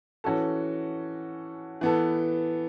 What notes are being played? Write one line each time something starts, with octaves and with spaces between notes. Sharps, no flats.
E3 C#4 F#4 A4
E3 B3 A4